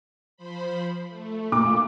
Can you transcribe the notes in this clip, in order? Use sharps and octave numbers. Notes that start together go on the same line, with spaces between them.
F3 C5 B5
A3
A#2 D6